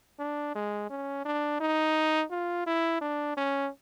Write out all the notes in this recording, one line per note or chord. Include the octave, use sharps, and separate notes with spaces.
D4
G#3
C#4
D4
D#4
F4
E4
D4
C#4